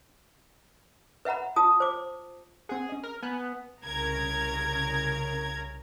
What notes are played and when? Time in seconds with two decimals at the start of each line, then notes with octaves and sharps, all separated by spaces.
1.25 B4 E5 F#5 A#5 B5
1.56 F4 A5 D#6
1.80 C5 D6
2.69 C4 G#4 F#5
2.89 C#4 D#5
3.03 A#4 F6
3.22 B3 G#5 F#6
3.83 C2 C#3 A#4 A#5 G#6